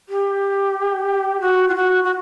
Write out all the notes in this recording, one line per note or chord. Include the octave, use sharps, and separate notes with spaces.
G4
F#4
F4
F#4
F#4